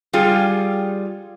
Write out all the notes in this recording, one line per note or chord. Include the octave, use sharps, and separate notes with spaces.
G3 F4 G#4